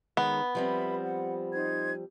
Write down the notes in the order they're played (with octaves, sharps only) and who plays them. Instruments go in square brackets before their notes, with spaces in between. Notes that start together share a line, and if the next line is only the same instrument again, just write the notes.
[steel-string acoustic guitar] D#3 G#3 C#4 [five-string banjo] B3
[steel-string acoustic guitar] F3 G3 C4 [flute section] B4 E5 B5
[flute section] F#5
D#4 C5 G#6